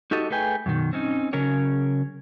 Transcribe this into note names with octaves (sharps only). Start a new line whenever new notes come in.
D#4 F#4 G4 A4 D#5
A3 G#4 B4 G5 G#5
F#2 B2 D#3
C4 C#4 D#4
C#3 F#3 C#4 A#4 C#5